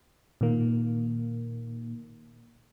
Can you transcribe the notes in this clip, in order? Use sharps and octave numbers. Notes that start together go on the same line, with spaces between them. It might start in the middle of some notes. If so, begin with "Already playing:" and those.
A#2 D#3 A#3